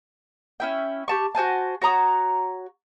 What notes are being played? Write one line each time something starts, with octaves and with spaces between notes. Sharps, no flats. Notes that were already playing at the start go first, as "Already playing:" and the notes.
C#4 E4 G5
G4 A5 C#6
F#4 C5 G#5 A5
F#4 C#5 A#5 D#6